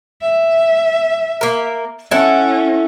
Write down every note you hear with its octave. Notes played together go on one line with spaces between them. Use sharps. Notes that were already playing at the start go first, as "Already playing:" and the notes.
E5
A#3 A#4
C#4 E4 A4 F#5